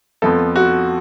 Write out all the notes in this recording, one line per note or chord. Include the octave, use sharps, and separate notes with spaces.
F2 F3 B3 A4
F#4